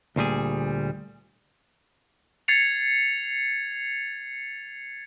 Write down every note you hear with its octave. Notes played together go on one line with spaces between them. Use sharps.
D2 A#2 G3 G#4
G#6 A6 C7 C#7 F7